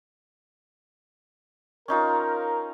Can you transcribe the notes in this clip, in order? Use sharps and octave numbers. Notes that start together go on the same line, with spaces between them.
C#4 D#4 F4 A#4